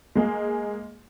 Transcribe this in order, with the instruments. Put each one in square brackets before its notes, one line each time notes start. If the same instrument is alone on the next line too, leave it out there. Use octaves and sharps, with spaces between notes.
[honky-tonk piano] G#3 A#3 G#4